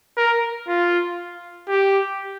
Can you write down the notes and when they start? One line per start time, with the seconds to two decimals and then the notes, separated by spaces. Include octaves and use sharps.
0.17 A#4
0.68 F4
1.69 G4